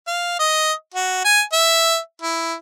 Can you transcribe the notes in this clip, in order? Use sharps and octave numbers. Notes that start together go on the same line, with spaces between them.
F5
D#5
F#4
G#5
E5
E4